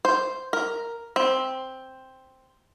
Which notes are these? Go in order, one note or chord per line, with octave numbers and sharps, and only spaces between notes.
C5
A#4
C4